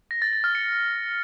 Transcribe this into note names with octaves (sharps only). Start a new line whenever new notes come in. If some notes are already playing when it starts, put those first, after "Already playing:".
A#6
A6
A6
F6
C#7